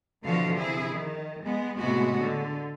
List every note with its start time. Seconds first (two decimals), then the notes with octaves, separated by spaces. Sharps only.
0.23 B2 D3 E3 F3 F#4 F5
0.56 C3 E4 G#4
0.93 D#3
1.44 G#3 B3
1.78 A2 C3 G#3 B3 F#4
2.18 D3